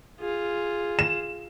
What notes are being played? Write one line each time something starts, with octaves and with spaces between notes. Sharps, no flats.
F4 G#4
E7